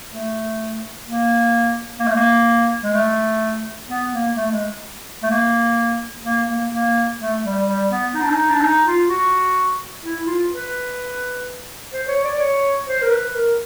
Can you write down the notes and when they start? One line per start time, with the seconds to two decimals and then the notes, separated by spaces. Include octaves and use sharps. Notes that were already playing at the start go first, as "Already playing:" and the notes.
0.10 A3
1.05 A#3
2.00 A#3
2.07 A3
2.16 A#3
2.83 G#3
2.94 A3
3.89 B3
4.12 A#3
4.36 A3
4.52 G#3
5.23 A3
5.30 A#3
6.24 A#3
6.48 A#3
6.72 A#3
7.20 A3
7.43 G3
7.67 G3
7.90 B3
8.14 D#4
8.22 D4
8.30 D#4
8.50 D4
8.61 D#4
8.85 F4
9.08 F#4
10.03 E4
10.26 F4
10.51 B4
11.93 C5
12.08 C#5
12.24 D5
12.40 C#5
12.87 C5
13.02 A#4
13.10 B4
13.34 A#4